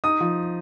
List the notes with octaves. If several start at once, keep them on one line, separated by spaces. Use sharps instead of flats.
D#4 D#6
F3